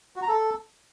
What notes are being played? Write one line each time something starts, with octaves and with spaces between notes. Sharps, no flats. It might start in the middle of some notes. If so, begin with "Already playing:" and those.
F#4
A#5
A4